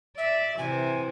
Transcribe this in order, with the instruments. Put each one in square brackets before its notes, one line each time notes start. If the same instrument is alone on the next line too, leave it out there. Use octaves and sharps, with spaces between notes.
[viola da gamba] D5 [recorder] E5
[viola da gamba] C3 E3 [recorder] G#5